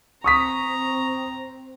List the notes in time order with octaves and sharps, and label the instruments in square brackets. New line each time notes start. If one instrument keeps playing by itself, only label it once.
[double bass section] C4 [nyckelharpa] A#5 [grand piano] C#6 D#6 B6